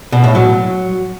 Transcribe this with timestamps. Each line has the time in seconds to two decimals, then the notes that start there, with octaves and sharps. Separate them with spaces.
0.12 B2
0.24 A2
0.35 F#3